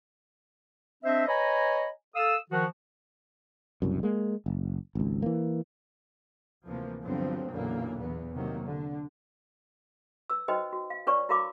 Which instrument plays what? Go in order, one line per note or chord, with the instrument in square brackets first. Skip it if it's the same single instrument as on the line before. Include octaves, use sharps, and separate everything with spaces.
[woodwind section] C4 D4 C5 D#5 E5
B4 C#5 D#5 G#5 A#5 B5
A4 F5 D#6 E6
D#3 F3 F#4
[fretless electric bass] F#1 C2 F#2
G#3 A#3
F#1
G#1 C#2
E3 A#3
[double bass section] D2 C3 E3 F3 A#3
G2 D3 F3 F#3 B3 C4
B1 F#2 A#2 D3 E3 A#3
E2 B3
C3 D#3 F#3 A#3
D3
[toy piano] B4 E6
D#4 F#4 B4 C5 D#5 G5
F#4
F5
D4 B4 C#5 D5 C#6
E4 F#4 A#4 F5 B5 D6